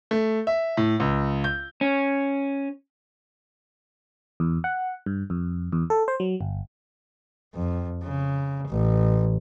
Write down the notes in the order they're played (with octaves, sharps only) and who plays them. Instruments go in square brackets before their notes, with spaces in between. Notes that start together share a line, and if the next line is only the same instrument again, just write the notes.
[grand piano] A3
E5
A2
C#2
G6
[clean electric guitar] C#4
[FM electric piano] E2
F#5
G2
F2
E2
A4
C5
F#3
G1
[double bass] F2
C#3
A1